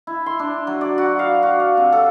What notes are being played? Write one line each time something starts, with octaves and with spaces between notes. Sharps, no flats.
E4
C6
D4
F#3
D5
F#4
F5
F#4
F5
C3
A4